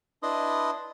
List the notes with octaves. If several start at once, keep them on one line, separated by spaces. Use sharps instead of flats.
D4 E4 B4 D#5 C6 D#6